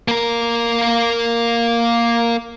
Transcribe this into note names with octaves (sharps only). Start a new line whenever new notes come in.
A#3 A#4